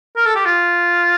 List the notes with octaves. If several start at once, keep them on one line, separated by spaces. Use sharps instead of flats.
A#4
A4
G4
F4